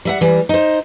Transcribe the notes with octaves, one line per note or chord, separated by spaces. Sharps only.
G3 E5 F#5
E3 G3
D#4 C5